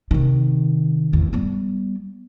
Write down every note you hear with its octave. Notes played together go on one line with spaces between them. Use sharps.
C3 D#3
G#1 E2
G3 B3